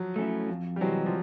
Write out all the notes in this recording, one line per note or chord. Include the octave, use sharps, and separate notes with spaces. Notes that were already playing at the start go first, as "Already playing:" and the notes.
Already playing: F3 F#3
A3 C#4 E4
F2
G3
C3 E3 F#3 G#3 C4
F3